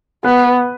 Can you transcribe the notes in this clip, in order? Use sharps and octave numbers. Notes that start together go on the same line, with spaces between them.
B3 B4